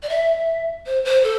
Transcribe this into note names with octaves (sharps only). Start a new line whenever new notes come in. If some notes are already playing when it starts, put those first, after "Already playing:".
D5
E5
C5
C5
A4